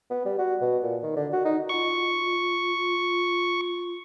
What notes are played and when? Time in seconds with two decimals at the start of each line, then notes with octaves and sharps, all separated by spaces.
0.10 B3
0.25 G3
0.38 F#4
0.61 B2
0.83 A#2
1.03 D#3
1.16 D3
1.33 F#4
1.45 D#4
1.69 F4 C#6